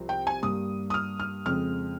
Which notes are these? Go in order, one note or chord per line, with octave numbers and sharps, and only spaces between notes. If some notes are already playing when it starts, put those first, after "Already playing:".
Already playing: C2 C3 F3 C4
G5
G#5
G2 G3 A#3 D#6
D#6
F6
F6
F2 C#3 G#3 C4 F6